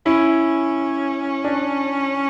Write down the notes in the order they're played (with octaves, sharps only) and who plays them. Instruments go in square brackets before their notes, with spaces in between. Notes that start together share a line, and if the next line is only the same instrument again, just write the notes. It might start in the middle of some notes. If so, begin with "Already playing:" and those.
[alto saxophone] C#4 [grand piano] E4
[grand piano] D4